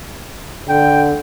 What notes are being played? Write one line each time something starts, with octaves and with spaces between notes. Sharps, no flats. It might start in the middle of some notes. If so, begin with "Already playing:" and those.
D3 G5